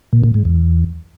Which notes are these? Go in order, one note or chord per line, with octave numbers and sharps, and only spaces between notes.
A#2
A#2
G#2
E2